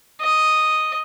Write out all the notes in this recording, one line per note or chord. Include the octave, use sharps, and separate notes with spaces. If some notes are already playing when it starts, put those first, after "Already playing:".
D#5